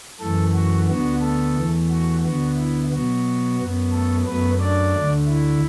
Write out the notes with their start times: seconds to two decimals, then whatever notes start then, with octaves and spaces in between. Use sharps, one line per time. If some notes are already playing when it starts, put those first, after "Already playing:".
0.20 F#2 E3 A3 A4
0.54 F#4
0.88 D2 D3 B3 F#4
1.21 A3 A4
1.55 E2 E3 A3
1.90 F#4
2.24 D2 D3 B3 F#4
2.57 E4
2.91 B2 F#3 B3 F#4
3.58 F#2 F#3 B3
3.92 A3 A4
4.26 F#2 F#3 A3 B3 B4
4.60 D4 D5
4.94 D2 D3 A3
5.27 E4